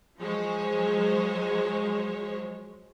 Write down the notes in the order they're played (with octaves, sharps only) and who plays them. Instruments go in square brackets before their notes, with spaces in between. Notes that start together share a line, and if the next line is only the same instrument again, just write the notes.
[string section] F3 F#3 G#3 C5 C#5